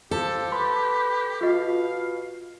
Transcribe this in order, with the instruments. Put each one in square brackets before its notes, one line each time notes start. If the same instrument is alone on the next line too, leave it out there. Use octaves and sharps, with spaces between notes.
[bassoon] F3 [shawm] G4 [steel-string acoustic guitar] A4
[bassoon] B4 [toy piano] C6 D6
[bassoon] B2 [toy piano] F4 G4 D#5 [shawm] F5